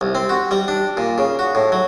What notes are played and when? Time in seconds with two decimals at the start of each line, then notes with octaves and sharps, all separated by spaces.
0.01 C2
0.15 C4
0.29 F#4
0.51 G3
0.68 D4
0.97 A#2
1.18 C#3
1.39 F#4
1.55 A2
1.72 F#3